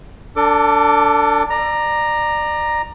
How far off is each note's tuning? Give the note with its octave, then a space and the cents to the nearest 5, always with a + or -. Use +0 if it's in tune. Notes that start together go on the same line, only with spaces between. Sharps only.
D4 -15 A4 +35 D6 +0
D5 +25 A#5 +0